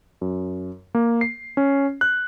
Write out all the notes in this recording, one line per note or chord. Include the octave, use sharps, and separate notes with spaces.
F#2
A#3
C7
C#4
F#6